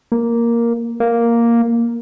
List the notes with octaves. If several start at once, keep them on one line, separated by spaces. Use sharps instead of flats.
A#3
A#3